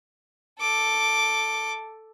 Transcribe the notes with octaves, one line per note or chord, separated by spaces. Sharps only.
A4 D6